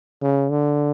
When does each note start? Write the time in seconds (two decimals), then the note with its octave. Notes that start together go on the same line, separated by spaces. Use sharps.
0.22 C#3
0.50 D3